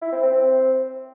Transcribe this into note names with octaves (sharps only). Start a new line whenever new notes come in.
E4
C4
C4
C4